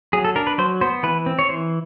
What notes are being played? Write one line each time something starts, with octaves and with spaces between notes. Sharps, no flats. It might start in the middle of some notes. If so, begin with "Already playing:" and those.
F#3 G#4
A4
D4 A#4
B4
F#3 C5
B3 C5
E3 B4
C4
C#5
E3 C5